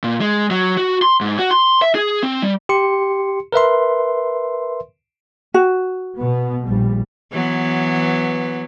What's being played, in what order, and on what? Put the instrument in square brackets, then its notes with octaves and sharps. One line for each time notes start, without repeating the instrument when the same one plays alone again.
[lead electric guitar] A#2
G#3
F#3
F#4
C6
G#2
F#4
C6
E5
G#4
C4
G3
[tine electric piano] G4 C6 C#7
A#4 B4 E5 C6
[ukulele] F#4
[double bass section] B2 B3
A#1 G3
[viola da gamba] E3 F#3 B3